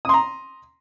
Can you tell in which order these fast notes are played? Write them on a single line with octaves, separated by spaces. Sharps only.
D#6 C6 A#5